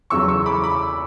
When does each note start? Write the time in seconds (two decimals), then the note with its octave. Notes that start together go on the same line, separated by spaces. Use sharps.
0.10 E2 C#3 F#3 C#6 E6
0.29 C#6 E6
0.46 B5 D6
0.64 B5 D6